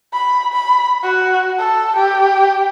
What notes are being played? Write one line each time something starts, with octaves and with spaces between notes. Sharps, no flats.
B5
B5
F#4
A4
G4